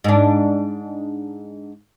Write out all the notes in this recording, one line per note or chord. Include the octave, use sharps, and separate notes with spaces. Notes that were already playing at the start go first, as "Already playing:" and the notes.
G#2 D4